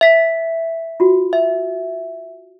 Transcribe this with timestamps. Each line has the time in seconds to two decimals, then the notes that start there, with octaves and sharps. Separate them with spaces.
0.01 E5 B6
1.00 F4 F#4
1.33 E5